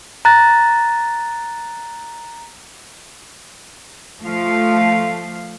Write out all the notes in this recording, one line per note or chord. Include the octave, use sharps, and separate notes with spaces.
A#5 F#6 A6
F3 A3 F5